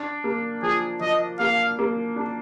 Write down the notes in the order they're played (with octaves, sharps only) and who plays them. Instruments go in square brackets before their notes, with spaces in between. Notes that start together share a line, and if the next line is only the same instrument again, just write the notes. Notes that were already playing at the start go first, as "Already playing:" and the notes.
Already playing: [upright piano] D4
A#3
[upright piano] F3 [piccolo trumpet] G#4
[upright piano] F3 [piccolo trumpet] D#5
[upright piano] A#3 [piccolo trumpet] F5
[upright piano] A#3
D4